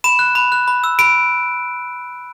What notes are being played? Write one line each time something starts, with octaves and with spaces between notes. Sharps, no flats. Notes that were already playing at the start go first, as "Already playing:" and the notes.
B5 E7
F#6
B5
F#6
B5
E6
B5 D7